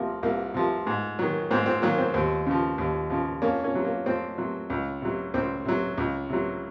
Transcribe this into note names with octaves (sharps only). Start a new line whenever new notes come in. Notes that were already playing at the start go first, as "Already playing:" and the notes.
Already playing: C2 C3 F3 A#3
C2 A#3
C3 F3
G#2
D#3 F#3
G#2 C4
C4
D#3 F#3 A#3
C4
D#2 C4
C#3 F3
D#2
C#3 F3
F2 A#3 C#4
A#3 C#4
C3 F#3
A#3
F2 C4
C3 F#3
C#2
C3 F#3
C#2 C4
C3 F#3
C#2
C3 F#3